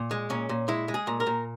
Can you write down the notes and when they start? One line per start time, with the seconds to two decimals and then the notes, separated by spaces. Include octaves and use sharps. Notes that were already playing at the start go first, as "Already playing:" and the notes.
Already playing: A#2
0.11 G#3
0.30 A#2 C#4
0.49 A#2
0.68 G#3 E4
0.88 G#3
0.94 G#4
1.07 A#2
1.20 A#4
1.27 A#2